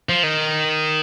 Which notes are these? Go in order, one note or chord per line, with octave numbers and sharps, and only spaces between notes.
F3
D#3